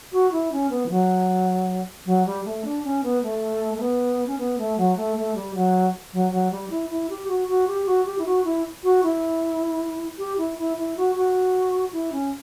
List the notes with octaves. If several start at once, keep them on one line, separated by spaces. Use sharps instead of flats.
F#4
E4
C#4
B3
E3
F#3
F#3
G3
A3
D4
C#4
B3
A3
A3
B3
C#4
B3
A3
F#3
A3
A3
G3
F#3
F#3
F#3
G3
E4
E4
G4
F#4
F#4
G4
F#4
G4
E4
F#4
E4
F#4
E4
G4
E4
E4
E4
F#4
F#4
E4
C#4